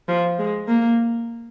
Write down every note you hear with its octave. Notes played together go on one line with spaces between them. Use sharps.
F3
G#3
A#3